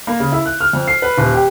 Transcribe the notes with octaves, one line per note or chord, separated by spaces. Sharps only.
A#3
C#3
E4
F#6
F6
F2
C7
B4
D#1
G4